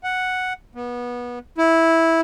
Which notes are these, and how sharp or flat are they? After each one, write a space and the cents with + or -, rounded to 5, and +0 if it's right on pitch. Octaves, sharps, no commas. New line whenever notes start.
F#5 +0
B3 -25
E4 -10